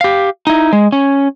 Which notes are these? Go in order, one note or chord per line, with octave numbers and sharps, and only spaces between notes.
G4 F5
D#4 E4
G#3
C#4